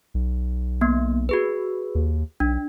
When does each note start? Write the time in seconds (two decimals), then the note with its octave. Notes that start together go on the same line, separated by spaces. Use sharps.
0.14 B1
0.81 A#3 B3
1.29 F#4 G#4 B4
1.95 D#2
2.40 B1 D4